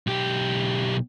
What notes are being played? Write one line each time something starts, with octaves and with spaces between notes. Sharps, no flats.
B1 G4